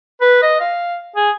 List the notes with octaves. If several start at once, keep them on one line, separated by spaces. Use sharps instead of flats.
B4
D#5
F5
G#4